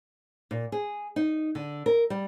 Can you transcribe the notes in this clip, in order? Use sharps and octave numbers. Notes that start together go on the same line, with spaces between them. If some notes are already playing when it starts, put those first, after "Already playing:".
A#2
G#4
D#4
D3
A#4
G3